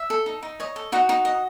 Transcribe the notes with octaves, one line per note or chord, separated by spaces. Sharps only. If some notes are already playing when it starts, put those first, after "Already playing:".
Already playing: E5
A4
D#4
D#4
C#5 D#5
A4
D#4 F#4 F#5
D#4
D#5